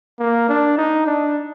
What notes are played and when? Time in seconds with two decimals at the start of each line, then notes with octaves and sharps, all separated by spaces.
0.19 A#3
0.49 D4
0.77 D#4
1.06 D4